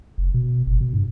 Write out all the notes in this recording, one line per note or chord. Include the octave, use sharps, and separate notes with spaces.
F1
B2
F#1
B2
G2